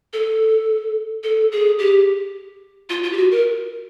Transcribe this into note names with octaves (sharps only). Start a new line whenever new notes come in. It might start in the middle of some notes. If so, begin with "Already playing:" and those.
A4
A4
G#4
G4
F4
F4
G4
F#4
A#4